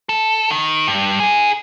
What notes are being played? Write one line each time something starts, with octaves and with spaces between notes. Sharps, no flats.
A4
D#3
G2
D#4 G#4